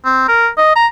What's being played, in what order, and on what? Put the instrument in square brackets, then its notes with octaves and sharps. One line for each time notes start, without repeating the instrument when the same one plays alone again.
[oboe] C4
A#4
D#5
A#5